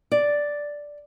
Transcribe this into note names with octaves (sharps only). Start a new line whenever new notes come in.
D5